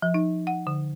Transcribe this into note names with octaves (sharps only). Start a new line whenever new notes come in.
F3
D#4
F#5
D3